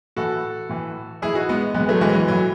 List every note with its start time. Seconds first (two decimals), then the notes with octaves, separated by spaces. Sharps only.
0.16 A2 E3 F#4 A4
0.69 A2 E3
1.22 A2 E3 E4 G#4
1.35 D#4 F#4
1.49 G#3 B3
1.74 A2 E3 G#3 B3
1.89 F#3 A3
2.01 E3 G#3
2.09 F#3
2.15 E3
2.28 A2 E3 F#3